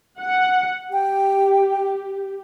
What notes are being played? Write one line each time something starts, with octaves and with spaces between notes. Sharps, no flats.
F#5
G4 G5